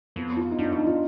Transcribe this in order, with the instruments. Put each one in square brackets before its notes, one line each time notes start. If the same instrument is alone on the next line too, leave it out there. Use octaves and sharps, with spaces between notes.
[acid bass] F2 [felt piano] B3
[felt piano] F4
D#4
[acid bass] F#2 [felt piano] D4
[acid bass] F2 [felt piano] D#4
[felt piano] F4